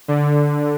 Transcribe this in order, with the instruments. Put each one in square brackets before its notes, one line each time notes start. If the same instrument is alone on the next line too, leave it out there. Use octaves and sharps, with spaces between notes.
[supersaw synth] D3